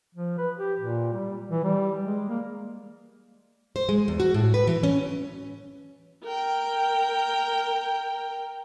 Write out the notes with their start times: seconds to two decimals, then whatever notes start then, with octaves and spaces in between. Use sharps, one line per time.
0.15 F3
0.38 B4
0.58 G4
0.79 A#2
1.13 G3
1.50 E3
1.64 G3
2.02 G#3
2.29 A#3
3.76 C5
3.89 G#3
4.08 E2
4.20 F#4
4.34 A2
4.54 B4
4.67 E3
4.83 C#4
6.24 A#4 G5